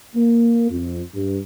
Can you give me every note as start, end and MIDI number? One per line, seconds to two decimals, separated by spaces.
0.15 0.69 58
0.70 1.02 41
1.14 1.38 43